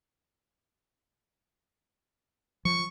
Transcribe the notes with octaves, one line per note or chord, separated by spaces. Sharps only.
F3 C#6